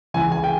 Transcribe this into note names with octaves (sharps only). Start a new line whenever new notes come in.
C#2 C#3 E3 G#5
G#5
G5